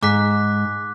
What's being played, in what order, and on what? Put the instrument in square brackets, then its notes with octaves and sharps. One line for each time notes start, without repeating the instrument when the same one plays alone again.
[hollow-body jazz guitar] G#2 [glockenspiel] D6 F#6 B6